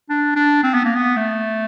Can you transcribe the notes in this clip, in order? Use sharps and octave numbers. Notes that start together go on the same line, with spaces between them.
D4
D4
C4
B3
A#3
B3
A3